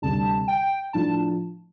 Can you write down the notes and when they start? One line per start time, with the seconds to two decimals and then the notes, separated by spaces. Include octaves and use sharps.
0.02 D2 C3 G3 A5
0.48 G5
0.93 A2 F3 D4 A5